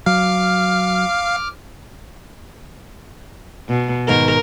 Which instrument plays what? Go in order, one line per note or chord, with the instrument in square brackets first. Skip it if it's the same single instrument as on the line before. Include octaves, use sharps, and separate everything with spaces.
[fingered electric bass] F#3 [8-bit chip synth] F5 [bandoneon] D6 F6
[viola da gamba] B2
[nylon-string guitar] G#2 B2 D#3 [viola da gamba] A#4